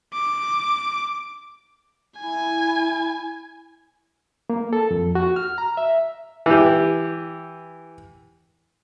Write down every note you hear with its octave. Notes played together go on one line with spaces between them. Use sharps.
D6
E4 G#5
A#3
A4
F2
F#4
F6
A#5
E5
E3 G4